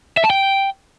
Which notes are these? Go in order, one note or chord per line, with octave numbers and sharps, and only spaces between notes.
E5
A5
G5